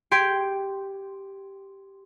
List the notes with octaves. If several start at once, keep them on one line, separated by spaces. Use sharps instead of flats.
G4 G5 C6 G#6 B6 D7